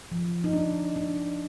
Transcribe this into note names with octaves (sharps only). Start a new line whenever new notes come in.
F3
D#4
D4
D4